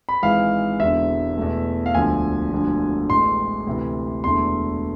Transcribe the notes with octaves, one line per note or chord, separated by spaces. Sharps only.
B5
G#1 G#2 E3 G#3 F5
E1 E2 D3 E5
E2 B2 A3
F5
E1 D2 D3 F3 G#5
E1 D2 D3 F3
A1 A2 G#3 C6
D2 C3 E3
E1 E2 D3 A3 C6